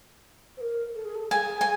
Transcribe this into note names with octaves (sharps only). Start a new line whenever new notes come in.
C5
A#4
A4
G#4
A4
G#4 G#5
G#5